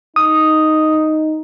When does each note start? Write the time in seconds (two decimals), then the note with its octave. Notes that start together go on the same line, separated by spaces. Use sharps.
0.16 D#4 D#6